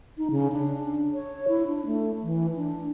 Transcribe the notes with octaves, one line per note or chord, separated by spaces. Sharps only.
D#4
C#3
D4
C#5
E4
D4
A3
E3
D4